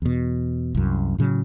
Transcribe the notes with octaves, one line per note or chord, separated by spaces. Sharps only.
E2 B2
C2 F#2
A2 C#3 F#3